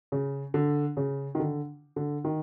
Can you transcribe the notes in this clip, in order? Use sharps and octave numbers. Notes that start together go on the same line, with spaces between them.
C#3
D3
C#3
D#3
D3
D3
D#3